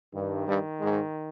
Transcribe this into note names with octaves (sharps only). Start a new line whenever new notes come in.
G2 D#3
G2 G3
G#2 G#3